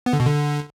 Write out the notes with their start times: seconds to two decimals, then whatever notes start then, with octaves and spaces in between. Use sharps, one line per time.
0.06 B3
0.13 D3
0.20 B2
0.27 D3